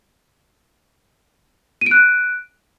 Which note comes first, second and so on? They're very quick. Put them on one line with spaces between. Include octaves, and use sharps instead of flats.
D#7 D7 F#6